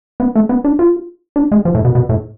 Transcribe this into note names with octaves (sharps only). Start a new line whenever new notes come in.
B3
A3
B3
D4
F4
D4
G#3
F3
A2
B2
B2
A2